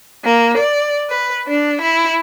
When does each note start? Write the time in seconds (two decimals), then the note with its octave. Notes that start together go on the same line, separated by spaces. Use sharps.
0.23 A#3
0.57 D5
1.09 B4
1.47 D4
1.80 E4